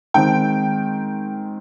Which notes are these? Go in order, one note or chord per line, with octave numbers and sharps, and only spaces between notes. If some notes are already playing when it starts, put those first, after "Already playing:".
D#3 G#3 C4 G5